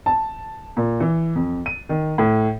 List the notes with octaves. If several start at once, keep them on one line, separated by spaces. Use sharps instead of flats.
A5
A#2
E3
F2
D#7
D#3
A2